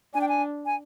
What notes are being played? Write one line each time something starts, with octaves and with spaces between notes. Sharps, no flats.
D4 G#5
G5
G#5
G#5